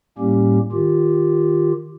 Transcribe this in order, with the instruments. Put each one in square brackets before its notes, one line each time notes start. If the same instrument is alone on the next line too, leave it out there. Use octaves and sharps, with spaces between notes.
[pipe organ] A2 G3 A#3 C#4 G4
D#3 F4 G4